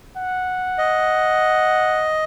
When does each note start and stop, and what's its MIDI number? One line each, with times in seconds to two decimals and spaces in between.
0.17 2.17 78
0.78 2.24 75